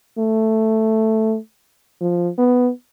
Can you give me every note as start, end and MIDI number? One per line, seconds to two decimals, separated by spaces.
0.18 1.37 57
2.01 2.29 53
2.38 2.70 59